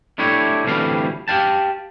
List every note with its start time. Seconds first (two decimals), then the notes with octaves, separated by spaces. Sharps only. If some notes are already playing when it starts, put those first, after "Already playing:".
0.18 A3 D4 E4 G4 C#5
0.64 D2 A2 C3 E3 G3 F5
1.28 G4 F5 G5 A5